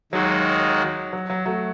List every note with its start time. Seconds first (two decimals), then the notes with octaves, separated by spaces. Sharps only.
0.12 D#2 D#3 F#3 G#3 D#4 F#4
1.13 F#3
1.30 F#3
1.46 F#3 A3